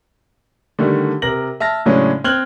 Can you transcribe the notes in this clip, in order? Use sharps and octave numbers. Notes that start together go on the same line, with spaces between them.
D3 D#3 G3 A3
C3 A#4 A#6 F#7
E5 A5 F6 A#6
A2 C#3 F#3 G#3 C#4 D4
C4 F6 F#6 G#6 F#7 G7